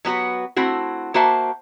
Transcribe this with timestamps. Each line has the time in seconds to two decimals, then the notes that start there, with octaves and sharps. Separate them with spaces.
0.05 F#3 B3 F#4 B4
0.56 A3 C4 E4 F#4
1.14 A#3 F#4 C5 E5 A5